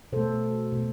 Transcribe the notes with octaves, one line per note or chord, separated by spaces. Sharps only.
B2 A3 A4 C5
B2 A3